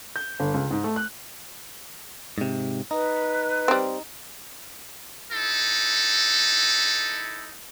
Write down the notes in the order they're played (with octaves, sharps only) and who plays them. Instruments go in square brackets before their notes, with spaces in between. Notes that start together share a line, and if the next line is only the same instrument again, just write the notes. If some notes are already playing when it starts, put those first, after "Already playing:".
[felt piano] G6
G1
C#2
G#2
A3
F#6
[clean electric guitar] G#2 C3
[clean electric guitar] D#4 [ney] B4
[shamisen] G3 C4
[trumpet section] D#4 E4 A4